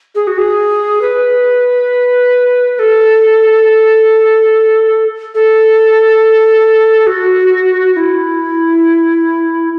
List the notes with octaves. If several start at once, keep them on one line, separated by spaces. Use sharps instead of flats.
G#4
F#4
G#4
B4
B4
A4
A4
F#4
F#4
E4